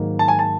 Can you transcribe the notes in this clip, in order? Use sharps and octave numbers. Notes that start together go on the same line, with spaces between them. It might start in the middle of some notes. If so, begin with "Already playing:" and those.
Already playing: G#2 D#3 F#3 A#3
A5
G#5
A5